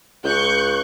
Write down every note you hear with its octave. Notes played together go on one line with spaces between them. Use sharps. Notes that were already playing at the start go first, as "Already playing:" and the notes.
C#2 C#6 F#6 G6